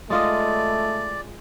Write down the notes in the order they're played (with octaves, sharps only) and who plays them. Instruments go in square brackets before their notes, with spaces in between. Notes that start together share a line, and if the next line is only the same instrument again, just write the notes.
[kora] G#3 F4 D#5 [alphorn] A3 [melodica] D5